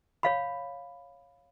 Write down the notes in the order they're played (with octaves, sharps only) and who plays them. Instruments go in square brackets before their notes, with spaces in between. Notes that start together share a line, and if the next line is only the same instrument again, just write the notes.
[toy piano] C#5 F5 B5